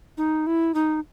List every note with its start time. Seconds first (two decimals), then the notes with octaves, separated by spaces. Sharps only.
0.18 D#4
0.47 E4
0.74 D#4